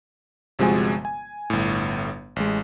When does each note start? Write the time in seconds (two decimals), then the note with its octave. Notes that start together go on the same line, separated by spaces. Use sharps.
0.59 G1 C3 F3 G#3 F#4 G#5
1.05 G#5
1.50 G1 A2
2.36 A1 G#3